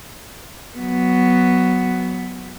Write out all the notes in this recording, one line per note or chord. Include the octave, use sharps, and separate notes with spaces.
F#3 B3